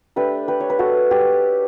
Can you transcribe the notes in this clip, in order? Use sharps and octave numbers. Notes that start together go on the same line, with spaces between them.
A3 D4 G4 B4
G4 B4
C#5
B4
F#4 A4
G4